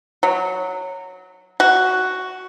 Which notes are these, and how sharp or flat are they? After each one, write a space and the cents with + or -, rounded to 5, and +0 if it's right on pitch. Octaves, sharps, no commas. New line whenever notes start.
F#3 -10
F#4 +5